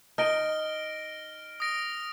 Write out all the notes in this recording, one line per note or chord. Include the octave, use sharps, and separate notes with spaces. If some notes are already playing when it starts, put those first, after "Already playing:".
D#4 F6 A#6 D7 G7
D#6 A#6 D7